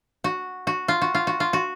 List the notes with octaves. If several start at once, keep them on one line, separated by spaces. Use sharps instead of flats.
F#4
F#4
F4
F#4
F4
F#4
F4
F#4